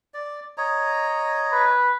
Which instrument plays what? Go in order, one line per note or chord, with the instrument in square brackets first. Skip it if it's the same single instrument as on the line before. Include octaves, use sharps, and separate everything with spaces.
[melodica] D5
C#5 D#5 A#5
[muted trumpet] B4